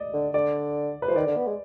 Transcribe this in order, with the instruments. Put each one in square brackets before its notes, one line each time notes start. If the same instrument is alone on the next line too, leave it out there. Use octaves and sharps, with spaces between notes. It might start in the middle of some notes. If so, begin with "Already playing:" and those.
Already playing: [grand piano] D5 D#5
[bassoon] D3
[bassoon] D3 [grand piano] D5
[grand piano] B4
[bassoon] F3 [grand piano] C5
[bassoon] D#3 [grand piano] D5
[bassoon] D3
B3
G#3